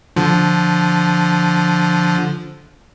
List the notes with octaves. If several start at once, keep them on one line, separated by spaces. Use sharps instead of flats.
D3 F3